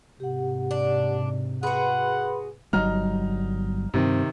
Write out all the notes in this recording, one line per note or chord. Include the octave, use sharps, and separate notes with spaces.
G#2 C3 G4 F#5
D4
F#4 G#4 B4 F#5 B5 C6
G1 F#3 G3 D#4 A#5 F6
G2 C3 D#3 C4